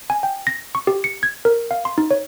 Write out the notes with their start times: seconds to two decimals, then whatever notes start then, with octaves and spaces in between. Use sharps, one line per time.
0.10 G#5
0.23 G5
0.47 A#6
0.75 C#6
0.87 G4
1.04 C#7
1.23 G#6
1.45 A#4
1.71 F5
1.85 C6
1.98 D#4
2.11 C#5